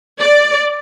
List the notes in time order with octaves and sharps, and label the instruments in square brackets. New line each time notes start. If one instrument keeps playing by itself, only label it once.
[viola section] D5